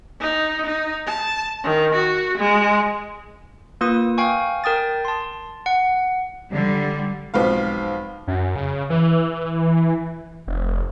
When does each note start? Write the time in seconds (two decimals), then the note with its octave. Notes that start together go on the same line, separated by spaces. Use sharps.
0.21 D#4
0.66 D#4
1.07 A5
1.64 D#3
1.95 F#4
2.38 G#3
3.81 A#3 F4 B4 D#6
4.18 F5 G5 G#5 C#6
4.64 A#4 G5 D#6 A6
5.05 A5 C6
5.66 F#5
6.52 D3 G3
7.34 B1 G#2 F3 C4 B4 F5
8.27 F#2
8.56 C#3
8.90 E3
10.47 F1